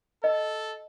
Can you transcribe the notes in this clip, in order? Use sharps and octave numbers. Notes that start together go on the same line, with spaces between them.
A4 D#5